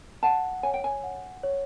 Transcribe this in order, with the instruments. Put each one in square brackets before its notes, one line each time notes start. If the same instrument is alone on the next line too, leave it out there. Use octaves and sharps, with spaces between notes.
[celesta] F#5 [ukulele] A5
[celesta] C#5 [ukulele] G#5
[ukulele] G5
G#5
[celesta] F#5
C#5